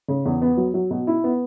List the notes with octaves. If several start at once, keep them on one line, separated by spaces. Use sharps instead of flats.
C#3
E2
B3
F#3
F#3
B2
E4
B3